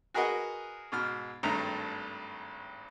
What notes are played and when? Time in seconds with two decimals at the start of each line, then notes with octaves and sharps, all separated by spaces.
0.14 F#4 G#4 A#4 B4 D#5 F#5
0.92 G#2 B2 F6
1.43 G#1 G2 A3 A#5